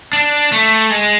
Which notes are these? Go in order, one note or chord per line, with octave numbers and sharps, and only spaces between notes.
D4
A3
G#3